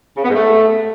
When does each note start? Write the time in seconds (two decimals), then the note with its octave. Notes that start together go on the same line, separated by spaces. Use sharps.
0.17 C#3
0.23 B3
0.29 G#2
0.35 A3